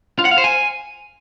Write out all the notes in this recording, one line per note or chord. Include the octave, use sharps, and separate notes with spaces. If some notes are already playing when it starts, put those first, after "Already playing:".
F4
F#5
F5
C5
G#5